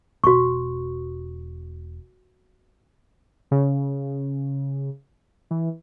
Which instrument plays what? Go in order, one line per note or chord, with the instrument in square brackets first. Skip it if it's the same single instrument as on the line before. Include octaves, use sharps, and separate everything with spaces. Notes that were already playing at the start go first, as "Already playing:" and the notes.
[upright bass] E1 [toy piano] F#4 C#6
[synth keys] C#3
E3